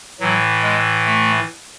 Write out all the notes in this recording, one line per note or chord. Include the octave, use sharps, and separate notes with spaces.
A2 E3 F#3
G#3
A3